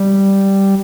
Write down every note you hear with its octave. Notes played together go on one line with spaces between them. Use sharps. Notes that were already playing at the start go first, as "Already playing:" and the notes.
Already playing: G3